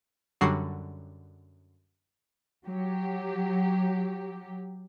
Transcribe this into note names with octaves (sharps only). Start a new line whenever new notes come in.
F#2 D3 F#3 G3 F#4 C7
F#3 G4